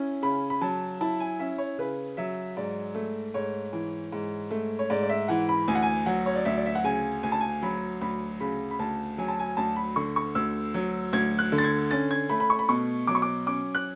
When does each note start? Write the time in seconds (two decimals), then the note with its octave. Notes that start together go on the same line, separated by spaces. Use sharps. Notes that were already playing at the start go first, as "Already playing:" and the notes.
Already playing: C#4 E4
0.22 C#3 B5
0.50 B5
0.61 F#3 A5
1.01 E4 A5
1.20 G#5
1.39 C#4 E5
1.58 C#5
1.78 C#3 B4
2.17 F#3 E5
2.57 G#2 D5
2.95 A3
3.34 G#2 C#5
3.73 E3
4.12 G#2
4.51 A3
4.79 C#5
4.90 G#2 D5
5.03 D5
5.09 E5
5.28 E3 F#5
5.49 B5
5.68 D2 G#5
5.75 F#5
5.82 G#5
6.06 F#3 F#5
6.26 C#5
6.35 D5
6.45 D2 E5
6.57 D5
6.66 E5
6.75 F#5
6.84 C#3 G#5
7.23 D2 G#5
7.32 A5
7.41 G#5
7.62 F#3 B5
8.01 D2 B5
8.40 C#3 B5
8.71 B5
8.79 D2 A5
9.18 F#3 G#5
9.28 A5
9.39 G#5
9.57 D2 A5
9.76 B5
9.96 D3 C#6
10.16 C#6
10.35 D2 E6
10.74 F#3
11.13 D2 G#6
11.39 F#6
11.52 D3
11.58 A6
11.64 G#6
11.91 C#4 A6
12.11 G#6
12.29 A3 B5
12.40 B5
12.50 C#6
12.59 B5
12.69 B2 C#6
13.07 F#3 D6
13.15 C#6
13.22 D6
13.46 C#4 D6
13.75 F#6